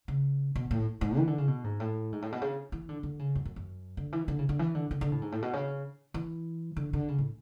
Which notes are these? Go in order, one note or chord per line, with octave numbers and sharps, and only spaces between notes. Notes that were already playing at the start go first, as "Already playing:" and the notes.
C#3
B2
A2
G#2
E3
D3
C#3
B2
G#2
A2
G#2
A2
B2
C#3
E3
D3
D3
C#3
F#2
F#2
F#2
D3
E3
D3
C#3
D3
E3
D3
D3
D3
A2
G#2
A2
B2
C#3
E3
D3
D3
C#3
A2